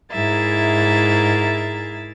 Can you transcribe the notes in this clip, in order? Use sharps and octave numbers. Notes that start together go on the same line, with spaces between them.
G#2 E4 G#4 A#4 E5 A6